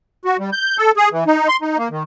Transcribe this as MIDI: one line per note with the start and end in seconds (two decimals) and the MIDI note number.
0.25 0.37 66
0.39 0.50 55
0.53 0.77 91
0.78 0.91 69
0.97 1.09 68
1.12 1.24 52
1.27 1.48 63
1.49 1.57 84
1.62 1.77 63
1.78 1.88 58
1.90 2.03 51